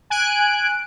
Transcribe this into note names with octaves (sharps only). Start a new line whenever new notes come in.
G#5 F#6 D7